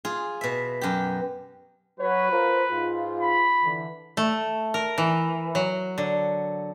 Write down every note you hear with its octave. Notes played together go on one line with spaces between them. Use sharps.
F4 G#4
B2 E5
F#2 G4
F#3 F#4 B4 C#5
F4 A#4 C5
G#2 F4
B5
D3 E3
A3
A#4
E3
F#3
D3